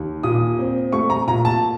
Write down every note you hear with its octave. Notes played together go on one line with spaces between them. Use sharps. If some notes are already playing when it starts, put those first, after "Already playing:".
Already playing: D#2
A#2 D#6
C4
A3 C#6
A#5
A#2 A#5
A5